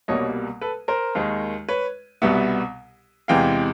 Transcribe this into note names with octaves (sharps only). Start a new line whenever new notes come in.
C2 B2 G3 A#3 C#5 D#5
A4 B4
A#4 C5
D#2 D#3 G#3
B4 C#5
C2 B2 G3 B3 E5 F#5
E2 C3 E3 G#3 F5 G5